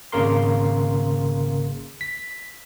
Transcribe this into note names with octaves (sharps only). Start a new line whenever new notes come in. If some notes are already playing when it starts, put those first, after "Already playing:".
G#1 C#3 A#3 A#4 C6
B6